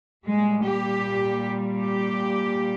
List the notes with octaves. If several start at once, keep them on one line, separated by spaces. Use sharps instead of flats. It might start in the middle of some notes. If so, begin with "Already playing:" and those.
A#2 G3 G#3
G4
G4